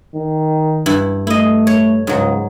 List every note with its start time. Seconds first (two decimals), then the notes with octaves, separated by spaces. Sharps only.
0.15 D#3
0.86 G2 E4
1.27 A3 E4 D#5
1.67 C#5
2.07 C#2 G#2 F#3